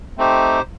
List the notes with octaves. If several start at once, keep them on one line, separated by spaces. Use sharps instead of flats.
A3 C4 D#4 G4 C5